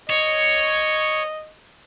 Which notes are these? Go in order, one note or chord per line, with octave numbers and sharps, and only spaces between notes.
C#5 D#5